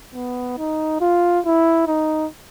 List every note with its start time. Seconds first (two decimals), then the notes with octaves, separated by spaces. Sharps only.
0.14 B3
0.58 D#4
1.01 F4
1.45 E4
1.87 D#4